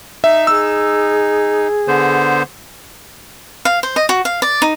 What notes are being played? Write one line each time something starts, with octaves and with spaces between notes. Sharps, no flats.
D#4 E5
G#4 E6
D3 B3 C5
F5
C5
D#5
F#4
F5
D5
D#4